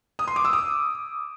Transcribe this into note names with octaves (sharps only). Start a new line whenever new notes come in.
D#6
C6
D6
E6
D#6